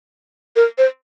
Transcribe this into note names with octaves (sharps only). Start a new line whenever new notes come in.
A#4
C5